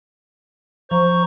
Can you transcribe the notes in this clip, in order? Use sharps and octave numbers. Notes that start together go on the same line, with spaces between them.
F3 C5 A#5 C#6